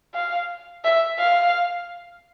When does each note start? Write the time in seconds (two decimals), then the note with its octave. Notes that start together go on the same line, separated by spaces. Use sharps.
0.14 F5
0.84 E5
1.18 F5